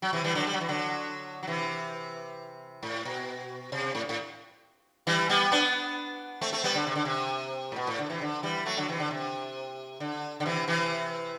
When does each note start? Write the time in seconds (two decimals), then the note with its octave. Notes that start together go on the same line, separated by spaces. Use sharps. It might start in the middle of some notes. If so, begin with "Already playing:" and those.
0.02 F#3
0.13 C3 E3
0.24 E3 G3
0.35 D3 F#3
0.47 G3
0.54 F#3
0.61 E3
0.68 D3 F#3
1.43 F#3
1.47 C3 E3
2.83 A2
3.05 B2
3.72 C3
3.95 A2
4.09 A2
5.07 E3 G3
5.29 G3 B3
5.52 B3 D4
6.41 A3 C4
6.53 A3 C4
6.64 G3 B3
6.75 D3
6.87 C3
6.96 D3
7.05 C3
7.72 A2
7.76 B2
7.87 A2
7.98 D3
8.10 C3 E3
8.21 D3
8.43 E3 G3
8.66 F#3 A3
8.77 D3 F#3
8.88 C3 E3
9.00 D3
9.11 C3
10.00 D3
10.40 D3
10.46 C3 E3
10.68 C3 E3